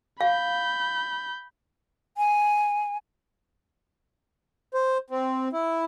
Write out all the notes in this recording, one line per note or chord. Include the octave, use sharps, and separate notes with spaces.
F5 B5 G6
G#5
C5
C4
E4